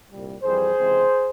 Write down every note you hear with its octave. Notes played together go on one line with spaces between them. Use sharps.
C2 A#2 G3
F2 E3 G3 G#4 C5
C#2 C3 E3 G#3 C4